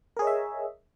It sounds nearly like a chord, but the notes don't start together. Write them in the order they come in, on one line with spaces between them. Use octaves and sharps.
A#4 G#4 C#5 D#5 E5